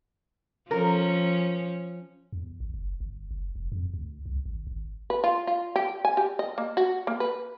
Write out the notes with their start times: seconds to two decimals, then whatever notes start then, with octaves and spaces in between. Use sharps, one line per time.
0.71 F3 C#4 A#4
2.32 E2
2.60 G#1
2.74 F#1
3.00 G1
3.31 F#1
3.55 F1
3.72 F2
3.94 D2
4.26 C2
4.46 G#1
4.67 G#1
5.10 B4
5.24 F4
5.47 F4
5.76 G4
6.05 G#5
6.17 G4
6.39 D#5
6.58 A#3
6.77 F#4
7.07 A#3
7.20 B4